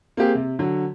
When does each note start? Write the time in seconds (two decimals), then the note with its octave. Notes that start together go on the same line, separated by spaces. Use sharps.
0.17 A#3 C4 G4 G#4
0.35 C3
0.59 D3 F#3